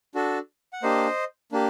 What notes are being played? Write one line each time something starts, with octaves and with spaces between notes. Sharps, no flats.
D4 F#4 A4
F#5
A#3 D4 G4 C5 D#5
A#3 D4 G4